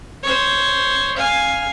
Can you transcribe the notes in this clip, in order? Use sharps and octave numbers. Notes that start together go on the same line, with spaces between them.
C5 C#5
F5 G#5